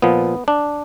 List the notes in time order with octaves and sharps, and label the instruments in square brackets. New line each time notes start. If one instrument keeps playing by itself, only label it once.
[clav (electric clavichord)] A#2 F3 B3
D4